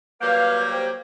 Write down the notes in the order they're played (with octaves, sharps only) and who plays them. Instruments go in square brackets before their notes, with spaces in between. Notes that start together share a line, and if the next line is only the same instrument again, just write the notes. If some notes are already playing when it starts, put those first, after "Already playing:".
[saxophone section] F#3 G3 A#3 [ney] B4 [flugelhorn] F5 [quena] G6
[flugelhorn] G4 [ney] C5